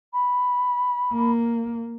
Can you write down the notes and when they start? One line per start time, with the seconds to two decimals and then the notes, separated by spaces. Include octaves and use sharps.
0.12 B5
1.13 A#3